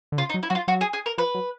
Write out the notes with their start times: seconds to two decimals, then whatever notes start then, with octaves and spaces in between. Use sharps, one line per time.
0.12 D3
0.18 C#3 F4
0.29 D#4
0.34 F#3
0.43 E4
0.50 F#3 F#4
0.55 F4
0.68 F#3 F#4
0.81 G#4
0.93 G#4
1.06 A#4
1.18 F3 B4
1.34 F#3